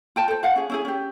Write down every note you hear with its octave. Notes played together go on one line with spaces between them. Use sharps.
F4 G5 A5
A4 C5
F4 F5 F#5
C#4 G#4
C#4 E4 G#4
C#4 G4